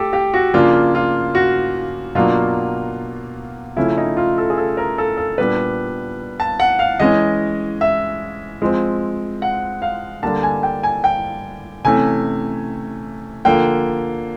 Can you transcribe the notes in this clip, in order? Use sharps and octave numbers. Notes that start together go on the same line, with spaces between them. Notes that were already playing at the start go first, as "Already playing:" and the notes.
Already playing: A3 G4 A4
G4
F#4
C#3 F3 A#3 D4 F4
F4
F#4
B2 F#3 A#3 D4 F4
C#3 F3 A3 C#4 E4
D#4
F4
A4
G#4
A4
A#4
A4
A4
A#2 G3 B3 D4 B4
A5
F#5
F5
E3 G#3 C#4 D#5
E5
F3 G#3 C4
F#5
F5
D3 G3 A#3 D4 A5
G#5
G5
G#5
G5
C3 E3 A3 C#4 G#5
D3 F3 A#3 G5